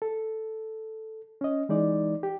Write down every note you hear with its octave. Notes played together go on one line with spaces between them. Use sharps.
A4
C#4 D#5
E3 G#3 D#4 D5
G4